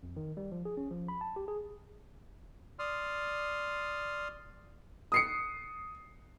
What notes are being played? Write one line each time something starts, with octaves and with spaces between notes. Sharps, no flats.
F2
D#3
G3
F3
G#4
C#4
F3
B5
A5
G4
G#4
D5 C6 D#6 F6
D#6 C7 C#7